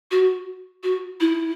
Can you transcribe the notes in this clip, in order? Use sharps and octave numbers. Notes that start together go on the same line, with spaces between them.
F#4
F#4
E4